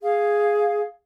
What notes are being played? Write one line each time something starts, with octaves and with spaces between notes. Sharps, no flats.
G#4 F5